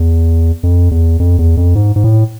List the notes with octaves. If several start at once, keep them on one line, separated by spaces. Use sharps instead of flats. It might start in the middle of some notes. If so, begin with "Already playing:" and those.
Already playing: E2
F2
E2
F2
E2
F2
G#2
G#2
A2